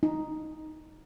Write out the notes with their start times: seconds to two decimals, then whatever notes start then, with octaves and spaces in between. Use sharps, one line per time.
0.03 D#4